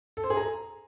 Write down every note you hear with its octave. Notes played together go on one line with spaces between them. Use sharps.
A4
C5
G#4
A#5